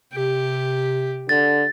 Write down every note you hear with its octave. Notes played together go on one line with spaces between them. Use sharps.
C3 G4
D3 A6